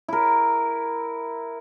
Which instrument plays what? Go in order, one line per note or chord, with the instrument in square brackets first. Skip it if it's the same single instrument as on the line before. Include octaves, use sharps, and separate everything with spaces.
[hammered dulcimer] E4 A#4